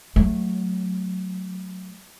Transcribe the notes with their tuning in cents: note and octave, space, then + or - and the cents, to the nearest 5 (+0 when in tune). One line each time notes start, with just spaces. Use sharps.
F#3 +0 A3 +0